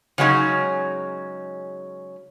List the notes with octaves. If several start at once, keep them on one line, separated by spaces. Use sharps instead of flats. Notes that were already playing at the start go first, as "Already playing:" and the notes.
C#3 F#3 G#3 C#4 D#4